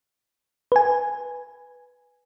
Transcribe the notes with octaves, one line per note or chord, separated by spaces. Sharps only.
B4 G#5